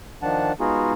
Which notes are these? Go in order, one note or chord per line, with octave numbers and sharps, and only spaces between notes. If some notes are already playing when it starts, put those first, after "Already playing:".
D#3 F3 D4 F#5 A5
G#3 B3 D#4 F4 F#4 G#4